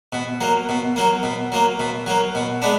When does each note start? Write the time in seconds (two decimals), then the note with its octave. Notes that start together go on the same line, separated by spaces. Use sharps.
0.13 B2
0.41 F#3 A#3
0.69 B2
0.96 F#3 A#3
1.23 B2
1.52 F#3 A#3
1.79 B2
2.06 F#3 A#3
2.35 B2
2.62 G#3 B3 D4